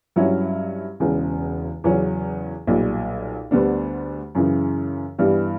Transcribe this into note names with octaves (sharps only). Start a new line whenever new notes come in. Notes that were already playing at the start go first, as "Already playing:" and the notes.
G2 F#3 C#4 E4
E1 E2 C#3
E2 C#3 F#3 C#4
B1 A#2 G3
D2 D3 G3 B3 D4
F#2 C#3 E3
G2 E3 G3 B3